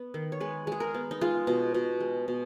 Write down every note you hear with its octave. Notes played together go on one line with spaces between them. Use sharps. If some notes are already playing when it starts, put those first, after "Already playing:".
Already playing: B3
D#3
C#5
G#3 B4
G#3 G#4
A#4
B3
D#4
G#3 F4
B2
B2
G#3
B2